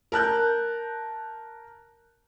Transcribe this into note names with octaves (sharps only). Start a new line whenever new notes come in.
A#4 A5 F#6 G6